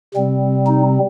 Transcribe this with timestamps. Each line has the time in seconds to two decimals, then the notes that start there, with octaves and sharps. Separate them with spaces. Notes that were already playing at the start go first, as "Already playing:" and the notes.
0.15 C3 G3 C4
0.67 D#4